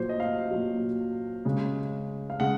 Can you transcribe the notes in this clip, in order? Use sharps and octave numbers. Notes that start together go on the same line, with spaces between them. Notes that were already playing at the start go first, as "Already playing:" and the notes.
Already playing: A#2 F#3 C5
D#5
F5
A#2 F#3
C#3 G#3
F5
C#3 G#3 F#5